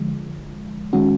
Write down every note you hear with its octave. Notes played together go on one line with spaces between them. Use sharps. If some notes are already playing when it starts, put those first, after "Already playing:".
Already playing: D3 F3 G#3
D#3 G#3 C#4 F#4